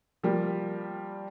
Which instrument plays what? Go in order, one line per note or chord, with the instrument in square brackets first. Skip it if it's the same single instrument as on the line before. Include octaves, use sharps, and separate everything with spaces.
[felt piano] F3 G3 A#3